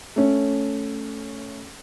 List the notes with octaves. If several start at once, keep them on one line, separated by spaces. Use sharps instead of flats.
A3 C#4